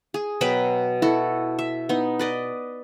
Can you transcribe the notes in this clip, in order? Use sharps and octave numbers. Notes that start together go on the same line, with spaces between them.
G#4
B2 F#3 B4 G5
E4 F#4 A4
E5
B3 D#4
B4 D5 D#5